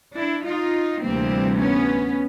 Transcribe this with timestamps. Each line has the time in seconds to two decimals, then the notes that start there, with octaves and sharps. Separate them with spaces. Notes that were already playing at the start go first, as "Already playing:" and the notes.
0.17 D4 E4
0.46 D#4 F4
1.04 D2 C3 E3 G3 A#3 C4
1.61 B3 C#4